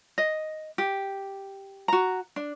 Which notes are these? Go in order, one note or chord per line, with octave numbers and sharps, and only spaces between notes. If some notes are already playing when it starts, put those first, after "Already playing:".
D#5
G4
F#4 A#5
D4